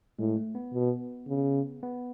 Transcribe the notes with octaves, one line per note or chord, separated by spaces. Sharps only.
A2 G#3
A3
B3
B2
C#3
B3